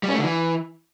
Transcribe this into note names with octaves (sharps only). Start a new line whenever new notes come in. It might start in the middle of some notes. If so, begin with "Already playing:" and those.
G3
C#4
A3
D3
E3